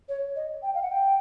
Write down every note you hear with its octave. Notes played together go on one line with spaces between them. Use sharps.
C#5
D#5
G5
F5
F#5
G5